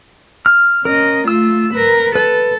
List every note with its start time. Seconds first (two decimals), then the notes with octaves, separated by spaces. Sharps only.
0.46 F6
0.85 C#4 A#4 D#5
1.28 A3 F4 E6
1.74 A#4 B4
2.15 A4 B4